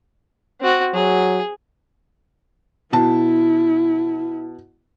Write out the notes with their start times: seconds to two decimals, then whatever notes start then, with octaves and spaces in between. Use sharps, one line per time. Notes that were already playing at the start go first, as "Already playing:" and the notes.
0.61 C4 F#4
0.94 F#3 G#4
2.92 B2 E4 A5